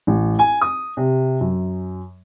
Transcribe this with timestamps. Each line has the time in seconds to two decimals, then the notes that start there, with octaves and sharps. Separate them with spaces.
0.07 A1
0.39 G#5
0.61 D#6
0.97 C3
1.41 F#2